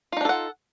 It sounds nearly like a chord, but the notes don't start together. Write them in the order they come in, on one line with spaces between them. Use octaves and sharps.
F4 D#4 D4 A4 F#5